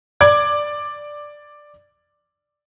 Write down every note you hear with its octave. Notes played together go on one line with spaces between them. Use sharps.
D5 D6 G#6